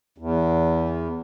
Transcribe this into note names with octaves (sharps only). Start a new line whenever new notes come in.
E2